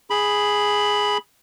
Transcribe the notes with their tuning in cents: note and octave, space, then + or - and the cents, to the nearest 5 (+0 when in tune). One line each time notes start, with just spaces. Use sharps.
G#4 +0 B5 +0